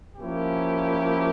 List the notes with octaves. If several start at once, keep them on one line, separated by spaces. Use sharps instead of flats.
F3 A#3 C#4 E4 G4